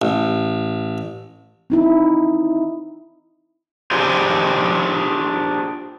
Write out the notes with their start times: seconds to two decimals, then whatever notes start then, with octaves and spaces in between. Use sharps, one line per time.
0.02 A1
1.70 C4 D#4 E4
3.92 D4 F4 G4 G#4 C5 D5